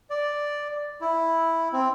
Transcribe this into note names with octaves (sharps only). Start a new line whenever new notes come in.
D5
E4
C4